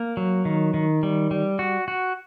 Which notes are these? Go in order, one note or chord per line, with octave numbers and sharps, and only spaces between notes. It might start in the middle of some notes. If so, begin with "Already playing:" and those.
Already playing: A#3
F#3
D#3
D#3
G3
G3
F#4
F#4